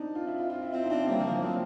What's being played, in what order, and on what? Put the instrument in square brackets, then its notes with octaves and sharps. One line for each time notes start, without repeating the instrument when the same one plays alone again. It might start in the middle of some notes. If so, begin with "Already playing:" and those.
Already playing: [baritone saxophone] C4 [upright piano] D4 D#4
[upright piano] F4
E4
F4
F4
E4
[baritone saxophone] C4 [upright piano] E4
[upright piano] D#4
[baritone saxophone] C4 [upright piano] D4
[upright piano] C#4
[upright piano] G3 [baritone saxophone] A#3
[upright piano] F3
[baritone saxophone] A#3
[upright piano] F3
[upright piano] F#3 [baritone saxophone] C4